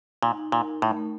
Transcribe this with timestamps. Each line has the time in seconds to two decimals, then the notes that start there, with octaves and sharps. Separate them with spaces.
0.23 A#2 D#4
0.38 D#4
0.52 A#2 A#4
0.67 D#4
0.82 A2 A3
0.97 A3